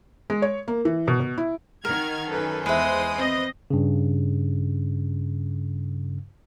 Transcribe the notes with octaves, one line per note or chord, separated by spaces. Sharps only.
G#3
C#5
A#3
E3
B2
B2
E4
D#3 A#4 F#5 F6 G#6
F#2 A4 B4 G#5
E2 G#3 B4 C5 E5 D#6
C4 D#5
G2 C#3